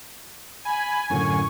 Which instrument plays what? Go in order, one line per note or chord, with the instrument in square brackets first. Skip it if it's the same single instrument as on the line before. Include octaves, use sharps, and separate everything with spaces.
[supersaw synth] G#5 [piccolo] B5
[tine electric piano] F#2 A2 D3 [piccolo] C#6